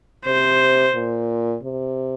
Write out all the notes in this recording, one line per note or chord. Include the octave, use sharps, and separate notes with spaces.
C3 C5
A#2
C3